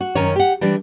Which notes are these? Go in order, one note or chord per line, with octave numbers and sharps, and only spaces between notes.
F#4
F#2 D#3 C#4 A#4 C#5
G4 F#5
E3 G3 D4